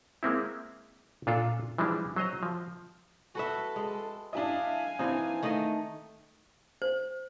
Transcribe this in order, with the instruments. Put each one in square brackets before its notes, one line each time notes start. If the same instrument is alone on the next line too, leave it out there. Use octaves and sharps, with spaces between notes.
[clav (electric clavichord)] G#3 A#3 C4 E4
A#2 D4 F4 A4
E3 F3 G3 G#3 D4
F#3 C5 D#5 A#5
F3
[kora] F#4 B4 E5 [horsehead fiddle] A4
[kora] G#3
[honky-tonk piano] D4 E4 D#5 [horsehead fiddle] F5 G#5
[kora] E3 D#4 [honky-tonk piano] C4 D4
[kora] D#3 A3 D#5
[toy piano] C5